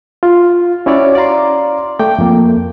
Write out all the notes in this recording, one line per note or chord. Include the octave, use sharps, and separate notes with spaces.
F4
C#4 E4 F#4 C#5 D5
D5 F5 A#5 C6
A3 G5 D6
F2 A#3